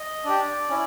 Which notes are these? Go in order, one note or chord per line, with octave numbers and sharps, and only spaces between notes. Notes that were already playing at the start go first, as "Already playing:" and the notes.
Already playing: D#5
D4 G4 D5
C#4 E4